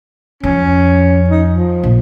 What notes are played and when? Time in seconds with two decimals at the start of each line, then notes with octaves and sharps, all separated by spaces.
0.44 F2 C#4
1.30 D#4
1.51 F3
1.84 A#1